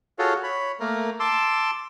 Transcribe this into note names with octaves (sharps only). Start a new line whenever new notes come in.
F4 F#4 G#4 A4 C#5
C#5 B5
A3 A#3 A#4
A5 C6 D6 E6